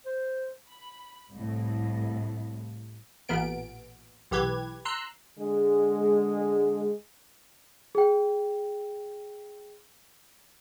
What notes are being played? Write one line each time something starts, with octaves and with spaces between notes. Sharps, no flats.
C5
B5
C2 A2
A1 A#2 B3 D7
B1 E3 G4 B4 G#6
A#5 C6 E6 F#6
D3 G#3
G#4 G5